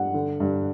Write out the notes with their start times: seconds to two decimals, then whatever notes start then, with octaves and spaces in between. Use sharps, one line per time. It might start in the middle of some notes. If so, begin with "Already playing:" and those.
Already playing: G2 F#5
0.14 D3
0.40 G2